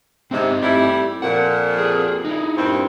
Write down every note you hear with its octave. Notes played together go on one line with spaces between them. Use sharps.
G#2 C3 C4 D#4 D#5
G3 A3 E4
F2 A#2 F#5
G#4 A4
D#4 E4
G2 A#2 C4